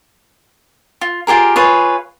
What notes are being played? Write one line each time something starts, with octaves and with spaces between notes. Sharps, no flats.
F4
F4 G4 G#4 A#4
F4 G#4 B4 C#5